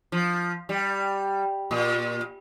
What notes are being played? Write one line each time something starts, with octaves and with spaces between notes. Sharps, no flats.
F3
G3
A#2